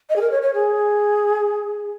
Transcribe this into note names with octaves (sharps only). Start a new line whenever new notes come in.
D#5
G#4
A#4
C#5
C#5
G#4